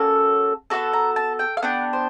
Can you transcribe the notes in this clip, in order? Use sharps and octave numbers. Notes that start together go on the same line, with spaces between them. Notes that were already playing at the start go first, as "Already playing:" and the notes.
Already playing: A#3 C#4 F#4 A4
B3 D4 F#4 A4 A5
A#5
A5
G5
F5
B3 D4 G4 F#5
C5